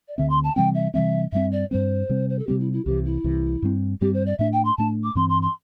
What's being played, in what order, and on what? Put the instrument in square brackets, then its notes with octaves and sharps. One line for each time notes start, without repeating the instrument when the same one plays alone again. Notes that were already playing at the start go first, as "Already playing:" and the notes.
[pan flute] D5
[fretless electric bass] D2 D3 C4 [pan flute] E5
[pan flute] C6
A5
[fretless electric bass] C3 E3 G3 C4 [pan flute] G5
[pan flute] E5
[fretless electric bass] C3 E3 G3 C4 [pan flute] E5
[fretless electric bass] G2 G3 C4 [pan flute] E5
[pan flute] D5
[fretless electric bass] G2 G3 C4 [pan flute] C5
[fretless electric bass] C3 G3 C4
[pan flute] C5
A4
[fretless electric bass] C3 G3 C4 [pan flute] G4
[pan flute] E4
E4
[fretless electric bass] C2 C3 E3 [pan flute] G4
[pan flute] E4
[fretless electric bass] C2 C3 E3
G2 G3 C4
[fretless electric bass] G2 G3 C4 [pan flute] G4
[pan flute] C5
D5
[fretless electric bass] A2 A3 D4 [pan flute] E5
[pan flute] G5
C6
[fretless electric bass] A2 A3 D4 [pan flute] A5
[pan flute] D6
[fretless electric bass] G2 E3 C4 [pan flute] C6
[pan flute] C6
C6